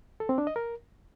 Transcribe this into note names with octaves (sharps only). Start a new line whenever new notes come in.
A4
C4
D4
D#5
A#4